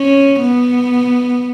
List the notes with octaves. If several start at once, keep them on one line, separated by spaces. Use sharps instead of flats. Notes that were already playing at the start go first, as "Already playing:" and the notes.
Already playing: C#4
B3